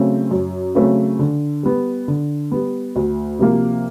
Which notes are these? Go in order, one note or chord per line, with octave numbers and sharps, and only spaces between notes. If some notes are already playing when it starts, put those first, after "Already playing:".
Already playing: C#3 F#3 A3 C4
F#2
C#3 F#3 A3 C4
D3
G3 B3
D3
G3 B3
D2
C3 F3 A#3